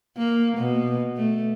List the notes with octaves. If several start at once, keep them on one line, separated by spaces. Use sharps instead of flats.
A#3
B2
A3